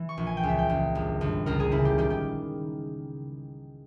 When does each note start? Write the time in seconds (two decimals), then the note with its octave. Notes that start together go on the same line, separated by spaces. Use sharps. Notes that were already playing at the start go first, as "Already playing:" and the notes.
Already playing: E3
0.09 C#6
0.17 A#1
0.27 G#5
0.37 G5
0.43 C#2
0.49 E5
0.59 G5
0.69 C#2
0.95 G1
1.21 G1
1.46 C#2 A#4
1.60 G#4
1.71 C#3 E4
1.85 G4
1.98 D#3 G4
2.10 G4